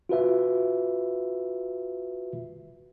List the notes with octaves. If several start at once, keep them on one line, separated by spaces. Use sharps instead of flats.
F4 F#4 B4 E5